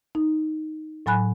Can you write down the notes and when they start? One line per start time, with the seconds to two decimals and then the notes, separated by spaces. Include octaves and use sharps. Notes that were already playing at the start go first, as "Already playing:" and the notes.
0.15 D#4
1.06 A2 F#3 G#5 B5 F#6